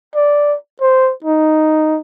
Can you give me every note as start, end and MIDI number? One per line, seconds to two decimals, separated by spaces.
0.15 0.55 74
0.81 1.12 72
1.24 2.00 63